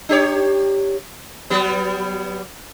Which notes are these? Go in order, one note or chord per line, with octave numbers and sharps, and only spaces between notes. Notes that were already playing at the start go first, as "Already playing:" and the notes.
D4 G4 C#5
F#3 G3 B3